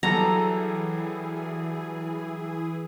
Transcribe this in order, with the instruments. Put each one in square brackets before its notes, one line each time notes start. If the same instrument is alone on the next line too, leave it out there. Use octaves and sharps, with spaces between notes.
[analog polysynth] E3 E4 G#4 [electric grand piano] F#3 G3 A4 [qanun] A#5